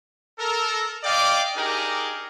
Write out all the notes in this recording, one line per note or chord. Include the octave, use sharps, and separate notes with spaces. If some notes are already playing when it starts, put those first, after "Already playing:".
A4 A#4
D5 D#5 F5 G5 D6
D4 D#4 G4 G#4 A#4